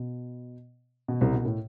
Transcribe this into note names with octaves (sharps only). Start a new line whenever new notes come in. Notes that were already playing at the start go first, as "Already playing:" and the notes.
Already playing: B2
B2
C2 C3
B2
A2